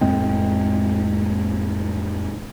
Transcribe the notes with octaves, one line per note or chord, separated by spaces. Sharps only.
F2 A2 G#3 C4